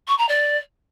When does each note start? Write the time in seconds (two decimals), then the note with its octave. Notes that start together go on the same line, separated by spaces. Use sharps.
0.08 C#6
0.18 A#5
0.29 D5